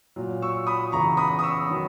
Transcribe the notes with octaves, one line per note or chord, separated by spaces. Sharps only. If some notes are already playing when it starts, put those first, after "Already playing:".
A#2 F#3
C#6 E6
B5 D#6
E2 C#3 E3 A#5 C#6
B5 D#6
D#6
C#6 E6
D#3 F#3